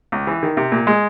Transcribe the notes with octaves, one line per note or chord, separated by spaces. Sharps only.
C#2
E3
D#3
C3
A#2
G#3